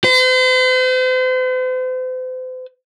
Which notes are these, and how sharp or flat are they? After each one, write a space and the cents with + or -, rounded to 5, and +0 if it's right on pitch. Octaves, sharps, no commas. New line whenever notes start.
C5 -40